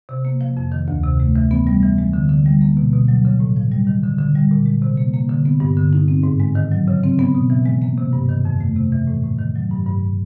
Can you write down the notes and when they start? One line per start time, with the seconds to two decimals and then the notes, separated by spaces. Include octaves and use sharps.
0.09 C3
0.25 A#3
0.41 F3
0.57 F2
0.72 D#3
0.88 D2
1.04 C3
1.20 A3
1.36 E3
1.51 B3
1.67 G3
1.83 E3
1.98 G#3
2.13 D3
2.29 D3
2.46 G3
2.61 A#3
2.77 B2
2.94 B2
3.08 F#3
3.25 C#3
3.40 A2
3.56 F3
3.72 G3
3.87 D#3
4.03 D3
4.19 D3
4.35 G3
4.51 A#2
4.66 G#3
4.82 C3
4.97 A#3
5.14 A#3
5.30 D3
5.46 B3
5.60 G2
5.77 D3
5.93 D#4
6.08 C4
6.23 G#2
6.40 G#3
6.55 D#3
6.72 F#3
6.88 C#3
7.03 C4
7.19 B3
7.35 B2
7.50 E3
7.66 G#3
7.82 A#3
7.98 C3
8.13 G2
8.29 D#3
8.45 F2
8.60 A3
8.76 C3
8.92 E3
9.07 A2
9.23 A2
9.39 D#3
9.56 F#3
9.71 G2
9.86 G2